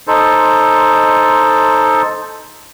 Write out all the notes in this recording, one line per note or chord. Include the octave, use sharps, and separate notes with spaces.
D#4 A4 C5